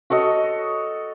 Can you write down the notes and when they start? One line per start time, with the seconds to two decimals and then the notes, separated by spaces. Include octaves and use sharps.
0.10 F#4 A4 C#5 D#5